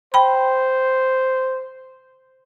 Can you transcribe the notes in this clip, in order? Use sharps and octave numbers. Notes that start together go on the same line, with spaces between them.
C5 G5 B5